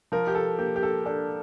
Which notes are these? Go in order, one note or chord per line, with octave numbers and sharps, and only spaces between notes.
F3 A#4
G4
A4
A#3 G4
G4
A4
D4 A4